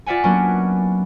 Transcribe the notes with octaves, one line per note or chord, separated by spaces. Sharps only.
F4 D5 E5 F#5 G#5
F#3 A#3 B3 C#4 D4